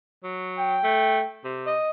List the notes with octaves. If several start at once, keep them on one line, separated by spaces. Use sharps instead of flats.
F#3
G5
A3
C3
D#5